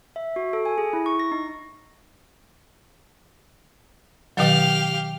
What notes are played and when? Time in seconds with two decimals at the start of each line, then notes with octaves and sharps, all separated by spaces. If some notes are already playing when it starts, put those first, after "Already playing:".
0.16 E5
0.36 F#4
0.53 A4
0.65 G#5
0.78 G#4
0.93 E4
1.06 C#6
1.19 A#6
1.32 D#4
4.37 B2 D#3 F#3 G4 F5